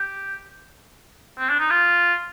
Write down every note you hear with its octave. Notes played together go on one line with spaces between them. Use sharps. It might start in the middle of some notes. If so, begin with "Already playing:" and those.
Already playing: G4
C4
D4
D#4
F4